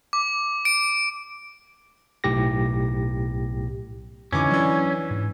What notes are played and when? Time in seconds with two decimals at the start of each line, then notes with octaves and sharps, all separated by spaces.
0.13 D6
0.65 D7
2.24 B1 A2 G4 A#6
4.33 F2 D3 E3 C#4 D#4 D6
4.51 E3 F#3 D4
5.11 G#2